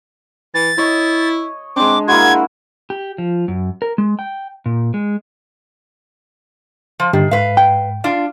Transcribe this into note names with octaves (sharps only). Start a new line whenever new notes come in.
E3 A6
E4 C#5 D#5
G#3 C4 D4 D6
G#3 A#3 E4 F#4 G#6
G4
F3
F#2
A#4
G#3
G5
A#2
G#3
F3
G2 D3 D#3 G4
G#2 B4 F5
G5
D4 F4